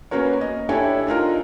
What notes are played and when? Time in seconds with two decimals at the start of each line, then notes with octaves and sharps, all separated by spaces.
0.11 A#3 B3 C#4 F#4 A#4 C#5
0.41 D#5
0.69 D4 E4 G4 A4 C#5 G#5
1.07 D4 D#4 F4 A#4